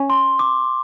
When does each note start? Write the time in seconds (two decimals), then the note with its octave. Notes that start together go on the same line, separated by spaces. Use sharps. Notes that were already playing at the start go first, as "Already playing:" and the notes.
Already playing: C#4
0.10 C6
0.39 D6